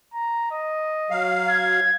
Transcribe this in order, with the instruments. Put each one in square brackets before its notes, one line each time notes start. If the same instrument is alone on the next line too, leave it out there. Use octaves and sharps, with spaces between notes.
[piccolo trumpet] A#5
D#5
[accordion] F#3 F5
[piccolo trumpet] G#6